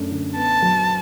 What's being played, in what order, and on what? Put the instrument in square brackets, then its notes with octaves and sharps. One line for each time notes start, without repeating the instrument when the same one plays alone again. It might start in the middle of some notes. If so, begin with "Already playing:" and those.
Already playing: [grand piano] F#2 A3 D4
D3
[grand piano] B3 [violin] A5
[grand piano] F#3